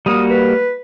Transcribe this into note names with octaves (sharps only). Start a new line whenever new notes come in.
G3 A#3 F#4 D#6
B4